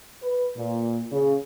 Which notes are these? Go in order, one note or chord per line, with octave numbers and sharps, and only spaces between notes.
B4
A#2
C#3